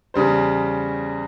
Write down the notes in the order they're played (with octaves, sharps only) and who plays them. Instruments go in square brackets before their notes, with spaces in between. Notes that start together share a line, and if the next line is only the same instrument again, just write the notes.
[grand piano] E2 C#3 G3 C5